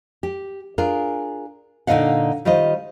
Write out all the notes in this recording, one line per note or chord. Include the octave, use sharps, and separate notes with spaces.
G4
D4 F4 G#4 A#4
A#2 D3 D#4 D#5 F5 F#5
D#3 G3 F4 C5 D#5